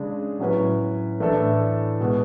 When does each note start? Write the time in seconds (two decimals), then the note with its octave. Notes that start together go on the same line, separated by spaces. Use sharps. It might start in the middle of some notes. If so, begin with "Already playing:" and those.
Already playing: C#3 G#3 D4 G#4
0.39 A2 F#3 C#4 F#4 B4
1.20 A2 E3 A3 D4 A4
2.00 B2 G#3 B3